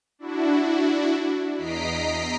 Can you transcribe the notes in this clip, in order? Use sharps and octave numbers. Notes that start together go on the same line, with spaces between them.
D4 E4 F#4
E2 D#5 A#5 B6 C7 D7